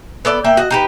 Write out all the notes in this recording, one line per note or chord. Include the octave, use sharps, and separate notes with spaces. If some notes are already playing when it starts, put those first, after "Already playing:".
B3 A4 D5
A#3 E5 G5
F#4 D#5
D#4 G4 B4